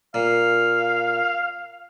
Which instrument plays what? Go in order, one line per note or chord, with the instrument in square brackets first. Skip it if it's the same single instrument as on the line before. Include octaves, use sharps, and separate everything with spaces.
[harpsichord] A#2 [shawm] F5